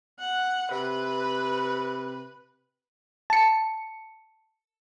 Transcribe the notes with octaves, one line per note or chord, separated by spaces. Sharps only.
F#5
C3 B4
A5 C#7